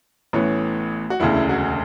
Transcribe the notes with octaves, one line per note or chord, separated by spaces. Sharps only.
A1 A2 E3 B3 C#5
F#4
E1 D2 C#3 E4
F#4